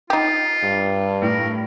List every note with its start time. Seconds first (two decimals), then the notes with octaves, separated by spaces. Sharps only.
0.10 D#4 F4 G4
0.63 G2
1.22 A2 A#4